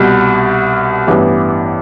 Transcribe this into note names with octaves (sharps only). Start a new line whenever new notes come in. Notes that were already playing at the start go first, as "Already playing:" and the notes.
Already playing: C2 B2 G3
A1 G2 E3 G3 B3